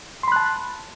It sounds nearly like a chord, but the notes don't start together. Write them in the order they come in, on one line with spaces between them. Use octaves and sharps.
C6 B5 F#6 A5